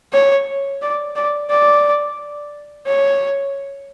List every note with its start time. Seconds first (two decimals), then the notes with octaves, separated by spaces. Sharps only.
0.13 C#5
0.82 D5
1.16 D5
1.50 D5
2.87 C#5